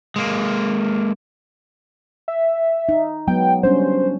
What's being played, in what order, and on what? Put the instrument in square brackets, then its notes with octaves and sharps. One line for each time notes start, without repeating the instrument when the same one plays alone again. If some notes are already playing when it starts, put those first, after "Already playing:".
[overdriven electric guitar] G#3 A#3
[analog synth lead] E5
[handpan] D#4
[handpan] F#3 G#3 B3 [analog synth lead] G5
[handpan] G3 C#4 D4 [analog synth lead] C5